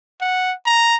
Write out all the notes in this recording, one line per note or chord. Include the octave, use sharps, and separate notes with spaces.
F#5
A#5